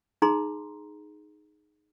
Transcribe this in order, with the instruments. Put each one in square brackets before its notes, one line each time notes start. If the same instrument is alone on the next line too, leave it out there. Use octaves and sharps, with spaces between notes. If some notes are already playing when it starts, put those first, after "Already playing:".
[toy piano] D#4 G#4 A#5 C6